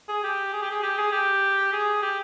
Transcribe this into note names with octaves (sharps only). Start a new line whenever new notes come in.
G#4
G4
G#4
G4
G#4
G4
G#4
G4
G#4
G4